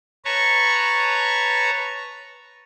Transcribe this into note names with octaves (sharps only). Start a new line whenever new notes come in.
B4 C#5 A5 A#5 C#6